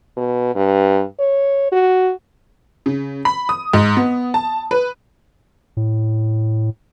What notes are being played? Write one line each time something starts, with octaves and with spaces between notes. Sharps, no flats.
B2
G2
C#5
F#4
C#3
B5
D#6
G#2
B3
A5
B4
A2